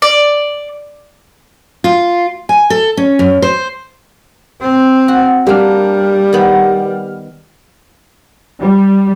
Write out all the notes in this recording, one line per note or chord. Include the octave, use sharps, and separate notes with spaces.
D5
F4
G#5
A4
C#4
F#2
C5
C4
F#4
G3 A#3 D4 G4 F6
D#3 B3
G3